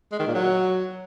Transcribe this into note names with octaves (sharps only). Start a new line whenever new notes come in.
G#3
D#3
A#2
F#3